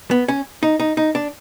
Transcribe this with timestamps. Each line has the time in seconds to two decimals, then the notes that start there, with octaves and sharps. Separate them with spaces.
0.11 B3
0.28 C#4
0.63 D#4
0.80 D#4
0.97 D#4
1.15 D4